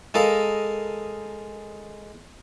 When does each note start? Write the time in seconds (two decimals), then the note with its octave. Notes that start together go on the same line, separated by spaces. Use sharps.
0.14 G#3 A4 A#4 D#5 F5